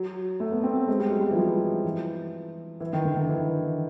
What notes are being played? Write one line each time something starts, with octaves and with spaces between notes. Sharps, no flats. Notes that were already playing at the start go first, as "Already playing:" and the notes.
Already playing: F#3
A3
B3
C4
B3
G#3
G3
F#3
G3
E3
F3
E3
E3
D#3
D3
D#3
E3